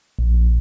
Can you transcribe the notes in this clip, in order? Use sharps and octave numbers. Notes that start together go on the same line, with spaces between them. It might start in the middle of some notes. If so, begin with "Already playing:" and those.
A#1